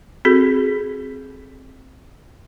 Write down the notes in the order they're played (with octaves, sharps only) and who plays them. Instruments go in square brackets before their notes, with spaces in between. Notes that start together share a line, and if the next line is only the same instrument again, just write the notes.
[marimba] C4 F#4 G#4 A4